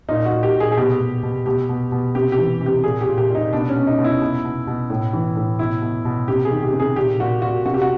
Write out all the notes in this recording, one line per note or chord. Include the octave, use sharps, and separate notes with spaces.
A#2 D#4
F#4
A#2
G4
A#2
G#4
G#4
B2 G4
B2
B2
B2 G4
B2
B2
C3 G4
G4
E3
C3
G4
A#2 G#4
G4
A#2
G4
A#2
D#4
B2 D4
C#4
B2
D#4
B2
E4
B2
B2
B2
A2
E3
A2
B2 E4
B2
B2
C3 G4
G#4
D#3
G4
C3
G#4
A#2 G4
A#2 F#4
A#2 F#4
C3 F#4
G4
F#4